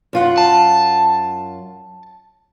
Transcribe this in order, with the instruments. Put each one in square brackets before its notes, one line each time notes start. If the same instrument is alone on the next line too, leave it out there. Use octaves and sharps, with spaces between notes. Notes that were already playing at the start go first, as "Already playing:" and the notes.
[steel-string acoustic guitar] F#2 F4 F#5
[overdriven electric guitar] A5